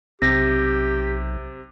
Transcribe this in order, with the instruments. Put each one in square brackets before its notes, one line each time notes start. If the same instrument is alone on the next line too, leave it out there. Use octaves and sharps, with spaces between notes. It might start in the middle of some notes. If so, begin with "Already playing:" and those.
[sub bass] B1 [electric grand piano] C3 [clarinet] G4 [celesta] A#6